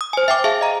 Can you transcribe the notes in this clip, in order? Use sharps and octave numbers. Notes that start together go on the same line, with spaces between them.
D#6
C5 G#5
E5 G5 D6
G#4 E5 F5 A5
D#5 A#5